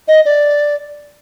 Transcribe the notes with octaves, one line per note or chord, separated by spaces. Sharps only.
D#5
D5